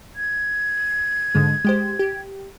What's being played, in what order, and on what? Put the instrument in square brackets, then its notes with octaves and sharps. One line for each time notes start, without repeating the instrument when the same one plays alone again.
[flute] G#6
[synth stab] G#2 D3 G#3
G#3 G4 C5
G4